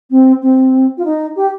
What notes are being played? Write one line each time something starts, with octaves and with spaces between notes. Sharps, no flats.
C4
C4
F4
D#4
G4